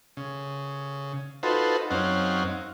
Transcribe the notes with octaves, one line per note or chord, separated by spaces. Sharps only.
C#3
D#4 F4 F#4 A4 B4 C5
F#2 C4 C#4 D#4 F5 F#5